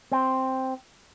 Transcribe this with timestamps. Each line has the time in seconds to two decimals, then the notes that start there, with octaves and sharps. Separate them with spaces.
0.12 C4